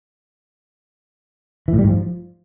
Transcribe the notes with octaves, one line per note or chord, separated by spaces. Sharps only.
E3
A2
G3
G#2
F3